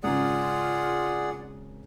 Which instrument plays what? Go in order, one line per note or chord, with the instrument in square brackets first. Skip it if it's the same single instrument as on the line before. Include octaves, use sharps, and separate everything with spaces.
[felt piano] G#1 C#3 A#5 [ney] F4 [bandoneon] G#4 D5 F#5